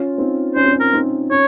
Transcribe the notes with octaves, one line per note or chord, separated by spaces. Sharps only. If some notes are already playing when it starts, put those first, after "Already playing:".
Already playing: C#4 F4
C4 D#4
C#4 C5
C4
C#4
A#4
C4 D#4
C#4 C#5